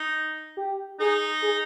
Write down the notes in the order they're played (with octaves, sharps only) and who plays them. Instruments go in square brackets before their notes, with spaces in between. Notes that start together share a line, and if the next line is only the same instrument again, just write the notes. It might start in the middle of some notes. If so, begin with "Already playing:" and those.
Already playing: [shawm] D#4
[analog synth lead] G4
[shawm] D#4 [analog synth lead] G#4
[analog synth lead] G#4